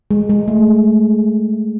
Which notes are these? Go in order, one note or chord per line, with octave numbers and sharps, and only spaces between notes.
G#3
G#3
A3